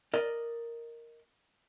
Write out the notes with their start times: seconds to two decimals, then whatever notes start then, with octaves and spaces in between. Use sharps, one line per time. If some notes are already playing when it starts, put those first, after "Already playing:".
0.14 A#4 D5 D#5